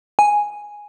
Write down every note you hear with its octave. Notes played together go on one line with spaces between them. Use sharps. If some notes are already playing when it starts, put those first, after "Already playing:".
G#5